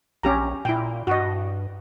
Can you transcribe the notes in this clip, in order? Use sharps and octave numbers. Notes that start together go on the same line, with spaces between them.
A#1 C#4 G4 A#5
A#2 E4 G5
G2 F#4 D#5